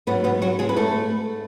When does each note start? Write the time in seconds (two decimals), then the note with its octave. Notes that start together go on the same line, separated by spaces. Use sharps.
0.07 G#2 F#3 B3 B4
0.24 B3 B4
0.42 F#3 F#4
0.59 G#3 G#4
0.69 B4
0.76 A3 A4